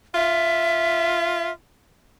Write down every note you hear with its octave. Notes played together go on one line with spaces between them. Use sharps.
F4 E5